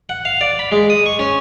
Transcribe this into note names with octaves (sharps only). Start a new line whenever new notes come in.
F#5
F5
D5
B5
G#3
D#6
C#6
C#4